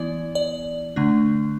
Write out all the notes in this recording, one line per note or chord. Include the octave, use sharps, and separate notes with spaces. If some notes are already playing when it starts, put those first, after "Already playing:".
Already playing: E3 B3 E4 D5
D5
D3 A3 D4